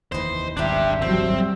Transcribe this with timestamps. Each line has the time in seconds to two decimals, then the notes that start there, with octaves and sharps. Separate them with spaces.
0.12 F1 D#2 E3 B4 C5 D#5
0.57 D#1 G#1 D4 E4 G4 A#4 C5
1.02 F#3 G3 A3 C4